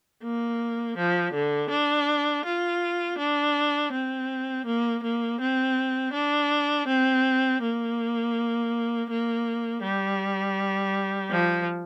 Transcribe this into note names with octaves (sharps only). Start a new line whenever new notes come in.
A#3
F3
D3
D4
F4
D4
C4
A#3
A#3
C4
D4
C4
A#3
A#3
G3
F3